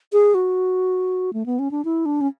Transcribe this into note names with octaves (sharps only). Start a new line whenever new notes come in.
G#4
F#4
A3
B3
C#4
D4
E4
D4
C#4